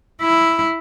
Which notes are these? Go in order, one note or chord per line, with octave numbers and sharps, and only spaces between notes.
E4